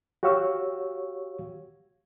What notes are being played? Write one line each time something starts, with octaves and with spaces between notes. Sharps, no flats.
F#4 G4 C#5 F5 C#6 E6